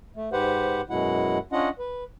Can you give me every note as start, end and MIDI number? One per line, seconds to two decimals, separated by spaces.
0.16 0.29 57
0.32 0.81 44
0.32 0.81 67
0.32 0.81 71
0.32 0.81 72
0.32 0.81 78
0.90 1.38 42
0.90 1.38 47
0.90 1.38 56
0.90 1.38 64
0.90 1.38 78
1.52 1.69 61
1.52 1.69 62
1.52 1.69 65
1.52 1.69 75
1.52 1.69 78
1.79 2.04 71